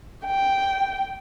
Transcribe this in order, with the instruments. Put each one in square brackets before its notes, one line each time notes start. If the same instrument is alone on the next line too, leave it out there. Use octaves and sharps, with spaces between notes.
[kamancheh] G5